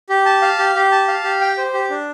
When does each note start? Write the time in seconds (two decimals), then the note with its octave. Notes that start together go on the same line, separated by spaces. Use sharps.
0.09 G4
0.26 A5
0.42 F5
0.59 G4
0.75 G4
0.92 A5
1.08 F5
1.24 G4
1.41 G5
1.58 C5
1.74 G4
1.90 D4